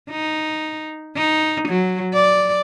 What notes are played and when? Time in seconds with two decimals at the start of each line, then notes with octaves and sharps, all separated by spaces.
0.10 D#4
1.16 D#4
1.68 F#3
2.13 D5